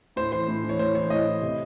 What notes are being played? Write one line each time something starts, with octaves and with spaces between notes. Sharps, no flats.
A2 C5
E3 C5
A2
E3
C#5
A2 C5
E3 C#5
A2 D#5
E3
C3